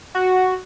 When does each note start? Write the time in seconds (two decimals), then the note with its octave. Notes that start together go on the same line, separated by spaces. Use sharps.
0.15 F#4